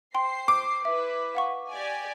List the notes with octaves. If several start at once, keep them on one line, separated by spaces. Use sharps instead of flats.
C5 G5 C6 C7
D6
E4 B4 E5
F5 F#5 C#6
G4 D5 G#5